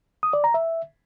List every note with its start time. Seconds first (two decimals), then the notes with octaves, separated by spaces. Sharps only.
0.23 D#6
0.33 D5
0.44 A#5
0.54 E5